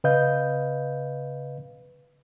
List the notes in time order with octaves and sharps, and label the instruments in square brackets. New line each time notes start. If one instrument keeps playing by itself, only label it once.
[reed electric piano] C#3 B4 D#5 F5 G6